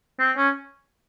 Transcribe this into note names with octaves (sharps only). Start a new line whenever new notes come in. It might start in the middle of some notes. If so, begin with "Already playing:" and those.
C4
C#4